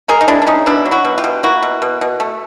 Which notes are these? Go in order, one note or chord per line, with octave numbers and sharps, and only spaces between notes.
G#3 G#4 A#4
D#4
G#3 D4 E4
D4
G#3 C#4 D#4
B2 D4 E4
F#3
E4 F#4
B2
F4 G4
B2
A#3 E4 F#4
B2
B2
B2
A3